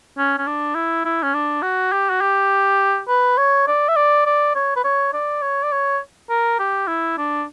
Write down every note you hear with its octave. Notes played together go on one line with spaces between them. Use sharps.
C#4
C#4
D4
E4
E4
C#4
D4
F#4
G4
F#4
G4
B4
C#5
D5
E5
D5
D5
C#5
B4
C#5
D5
C#5
D5
C#5
A#4
G4
E4
D4